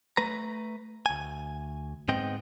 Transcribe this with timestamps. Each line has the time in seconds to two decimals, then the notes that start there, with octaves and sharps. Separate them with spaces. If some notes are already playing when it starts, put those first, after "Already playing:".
0.17 A3 B4 A#5
1.06 D2 G#5
2.08 G#2 B3 C4 D#5 G5